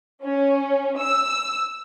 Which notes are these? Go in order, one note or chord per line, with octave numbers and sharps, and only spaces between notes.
C#4
E6